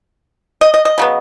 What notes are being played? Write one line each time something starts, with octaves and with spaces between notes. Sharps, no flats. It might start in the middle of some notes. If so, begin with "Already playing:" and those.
D#5
D#5
D#5
C#3 F#3 B3